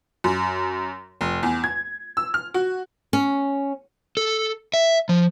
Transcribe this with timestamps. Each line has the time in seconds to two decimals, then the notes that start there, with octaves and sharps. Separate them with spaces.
0.24 F#2
1.21 F1
1.43 E2
1.64 G#6
2.17 E6
2.34 F6
2.54 F#4
3.13 C#4
4.17 A4
4.74 E5
5.09 F3